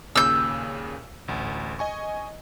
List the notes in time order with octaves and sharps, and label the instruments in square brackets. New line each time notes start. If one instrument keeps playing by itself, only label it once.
[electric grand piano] D#2 A#2 C#3 [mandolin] E6 G6
[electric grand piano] A1 D2
D#5 G#5 C#6